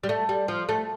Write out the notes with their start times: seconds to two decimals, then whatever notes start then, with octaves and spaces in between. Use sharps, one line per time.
0.03 G3
0.09 A3
0.29 G3
0.48 F3
0.69 A3